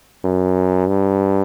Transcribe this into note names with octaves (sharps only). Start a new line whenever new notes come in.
F#2
G2